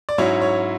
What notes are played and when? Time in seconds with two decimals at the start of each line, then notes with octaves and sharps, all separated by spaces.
0.09 D5
0.18 G#2 F#3 C#4 E4 C#5
0.41 C#5